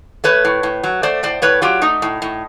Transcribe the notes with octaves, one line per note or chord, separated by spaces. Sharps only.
A3 B4 C#5
A2
A2
F#3
A3 C5 D5
A2 C5 D5
A2 B4 C#5
F#3 F4 G4
A3 D#4
A2
A2